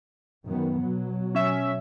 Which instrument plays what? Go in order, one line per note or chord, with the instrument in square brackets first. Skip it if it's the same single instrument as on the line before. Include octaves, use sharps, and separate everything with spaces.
[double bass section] F#2 D#3 B3
B2 F#3
[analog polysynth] C#4 E5